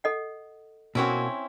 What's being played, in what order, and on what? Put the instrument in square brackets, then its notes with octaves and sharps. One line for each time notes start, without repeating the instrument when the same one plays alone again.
[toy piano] A4 D#5 F#5
[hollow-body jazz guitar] B2 A#3 F#4 [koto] C4 C#4 E4